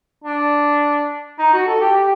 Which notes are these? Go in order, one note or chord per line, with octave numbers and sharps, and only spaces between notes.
D4
D#4
F#4
A4
G4
G4